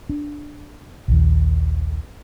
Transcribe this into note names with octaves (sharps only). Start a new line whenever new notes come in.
D4
A#1 D#2